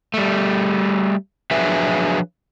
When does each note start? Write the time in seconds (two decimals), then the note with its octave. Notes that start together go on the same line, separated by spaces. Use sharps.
0.14 G3 A3
1.51 F3 F#3 D4 G#4 B4 E5